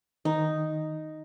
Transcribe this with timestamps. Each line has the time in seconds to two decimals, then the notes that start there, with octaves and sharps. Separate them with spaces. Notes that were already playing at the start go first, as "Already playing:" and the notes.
0.25 D#3 D#4